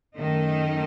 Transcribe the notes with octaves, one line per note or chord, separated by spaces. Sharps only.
F#2 D#3 A3 D#4